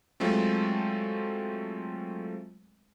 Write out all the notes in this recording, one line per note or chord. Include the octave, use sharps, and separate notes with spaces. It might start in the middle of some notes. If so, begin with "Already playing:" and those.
F#3 G#3 A3 C4 F4